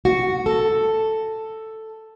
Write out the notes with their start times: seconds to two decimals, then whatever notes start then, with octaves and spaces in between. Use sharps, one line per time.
0.05 F#4
0.46 A4